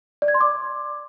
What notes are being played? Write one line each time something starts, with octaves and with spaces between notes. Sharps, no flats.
D5
G#6
C6
D6